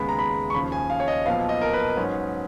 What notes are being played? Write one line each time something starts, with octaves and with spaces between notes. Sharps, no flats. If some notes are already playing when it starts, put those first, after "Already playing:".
Already playing: D#2 C#3 G#3 B3 B5
A#5
B5
C#6
D#2 C#3 F3 B5
G#5
F5
C#5
D#5
B1 A#2 F3 B3 F5
D#5
A#4
B4
G#2 F#3 C#4